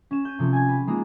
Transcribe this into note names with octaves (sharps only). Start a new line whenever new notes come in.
C#4 E7
G6 D#7
C3 F3 A3 C4
G#5 G#6
G4 B4
G#3 A#3 D#4 F4